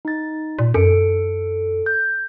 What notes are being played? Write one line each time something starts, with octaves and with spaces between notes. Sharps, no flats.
D#4 A6
A#2
F#2 A4 C#7 D7
G6